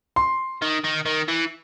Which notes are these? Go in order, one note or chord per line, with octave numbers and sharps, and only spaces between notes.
C6
D#3
D#3
D#3
E3